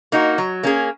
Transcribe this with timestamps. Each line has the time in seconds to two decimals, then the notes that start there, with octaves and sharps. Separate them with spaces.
0.12 A#3 D#4 F#4
0.38 F#3
0.63 A#3 C#4 G#4